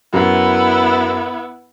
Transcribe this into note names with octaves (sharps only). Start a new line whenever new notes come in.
F#2 B3 E4